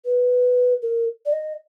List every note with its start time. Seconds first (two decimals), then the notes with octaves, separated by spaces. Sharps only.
0.05 B4
0.82 A#4
1.26 D5
1.32 D#5